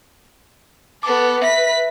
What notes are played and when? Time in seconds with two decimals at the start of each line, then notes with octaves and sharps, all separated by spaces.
1.03 B3 A4 D6
1.42 B4 E5 B6